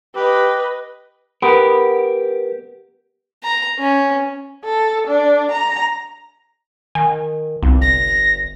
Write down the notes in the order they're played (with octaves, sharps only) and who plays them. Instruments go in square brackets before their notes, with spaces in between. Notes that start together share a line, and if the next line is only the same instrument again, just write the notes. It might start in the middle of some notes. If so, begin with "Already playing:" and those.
[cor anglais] G4 [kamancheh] B4 D#5
[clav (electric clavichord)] B3 [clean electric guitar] G4 A#4
[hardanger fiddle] A#5
C#4
[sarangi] A4
D4
A#5
[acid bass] D#3 [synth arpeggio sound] G#5
[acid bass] G1 [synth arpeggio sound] C2
[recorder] A#6